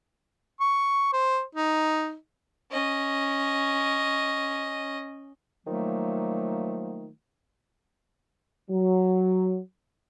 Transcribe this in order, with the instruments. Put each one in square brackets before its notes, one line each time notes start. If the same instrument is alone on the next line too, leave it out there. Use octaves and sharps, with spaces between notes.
[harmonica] C#6
C5
D#4
[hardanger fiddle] C#4 D#5
[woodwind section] D#3 F3 F#3 A3 A#3
[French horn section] F#3